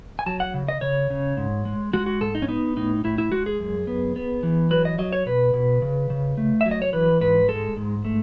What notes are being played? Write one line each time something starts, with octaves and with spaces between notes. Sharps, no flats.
G#5
F#3 A5
F#5
C#3
D#5
C#3 C#5
C#3
G#2
G#3
G#3 F#4
F#4
G#2 A4
D#4
C#4
B3 D#4
A2 D#4
A2 E4
E4
G#3 F#4
G#4
F#2
B3
B3
E3
F#3 B4
D#5
F#3 D#5
C#5
B2 B4
B2
C#3
C#3
A3
E5
F#3
D#5
C#5
E3 B4
G#2 B4
G#3 A4
G#2
A3